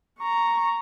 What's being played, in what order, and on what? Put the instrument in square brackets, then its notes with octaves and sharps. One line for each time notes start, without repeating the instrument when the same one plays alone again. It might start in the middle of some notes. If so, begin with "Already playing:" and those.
[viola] A#5 C#6